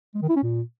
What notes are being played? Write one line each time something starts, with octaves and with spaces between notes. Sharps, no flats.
G#3
D#3
E4
C#4
A#2